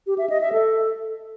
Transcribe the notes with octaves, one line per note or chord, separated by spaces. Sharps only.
G4
E5
D#5
E5
A4